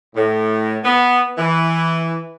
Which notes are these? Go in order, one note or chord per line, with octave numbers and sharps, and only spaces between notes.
A2
B3
E3